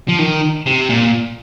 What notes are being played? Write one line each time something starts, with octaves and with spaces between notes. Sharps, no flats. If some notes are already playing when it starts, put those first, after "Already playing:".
F3
D#3
C3
A#2